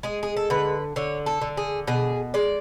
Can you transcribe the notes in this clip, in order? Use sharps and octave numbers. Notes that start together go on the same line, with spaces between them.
G#3 G#4
G#4
A4
D3 B4
D3 C#5
A4
D3
G#4
B2 G#4
G#3 D5